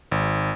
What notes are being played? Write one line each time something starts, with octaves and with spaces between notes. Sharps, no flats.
G#1